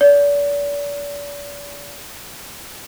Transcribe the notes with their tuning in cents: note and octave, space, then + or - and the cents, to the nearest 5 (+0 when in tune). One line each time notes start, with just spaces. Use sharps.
D5 -40